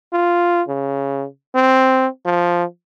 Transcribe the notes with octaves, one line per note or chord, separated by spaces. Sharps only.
F4
C#3
C4
F3